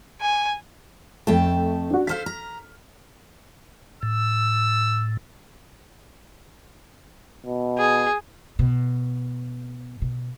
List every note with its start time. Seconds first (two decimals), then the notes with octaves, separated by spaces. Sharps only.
0.21 G#5
1.27 F2 A3 G5 A5
1.90 D4 F#4
2.07 A4 C5 F5 F6 B6
2.26 A#5
4.03 A2 E6
7.46 B2
7.78 G#4
8.59 B2
10.02 B2